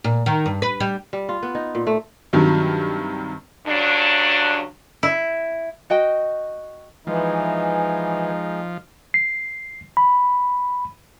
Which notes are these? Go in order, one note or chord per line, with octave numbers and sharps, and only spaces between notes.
A#2
D#3
G2
B4
G3
G3
F4
B3
D#4
A#2
A3
G2 C3 D#3 F#3
G2 C#3 F#3 D4
E4
F#4 D#5 G5
E3 F3 G#3 D#4
C7
B5